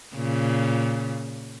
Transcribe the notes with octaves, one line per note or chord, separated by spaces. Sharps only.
A#2 C#3